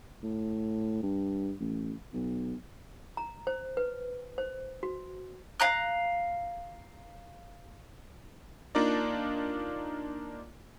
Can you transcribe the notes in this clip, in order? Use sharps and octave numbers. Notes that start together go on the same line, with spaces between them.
A2
G2
A1
B1
A#5
C5
B4
C5
F#4
F5 A#5 F#6
A#3 D4 D#4 F4 A#4 D5